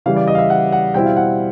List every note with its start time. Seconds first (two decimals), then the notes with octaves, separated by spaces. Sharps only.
0.06 C#3 E3 G3 F5
0.16 D5
0.28 D#5
0.35 F5
0.38 E5
0.50 F#5
0.72 F#5
0.94 B2 G3 C4 E4 G5
1.06 F5
1.17 F#5